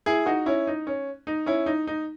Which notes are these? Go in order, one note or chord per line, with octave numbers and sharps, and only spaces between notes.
E4 G#4
D#4 F#4
C#4 E4
D#4
C#4
D#4
C#4 E4
D#4
D#4